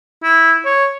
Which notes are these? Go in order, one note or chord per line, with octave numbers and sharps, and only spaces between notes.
E4
C#5